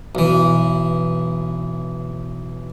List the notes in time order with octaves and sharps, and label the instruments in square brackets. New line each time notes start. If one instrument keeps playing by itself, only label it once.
[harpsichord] B1 E3